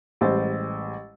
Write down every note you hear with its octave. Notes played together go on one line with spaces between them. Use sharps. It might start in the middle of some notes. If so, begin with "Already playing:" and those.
A1 G3 G#3 C5 A6